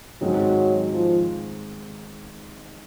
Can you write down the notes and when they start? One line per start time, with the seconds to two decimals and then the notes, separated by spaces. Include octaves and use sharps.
0.21 G#2 D#3 F#3 G#3 C4
0.93 F3